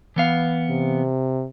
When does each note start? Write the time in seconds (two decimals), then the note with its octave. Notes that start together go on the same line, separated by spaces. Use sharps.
0.16 E3 B3 F5
0.70 C3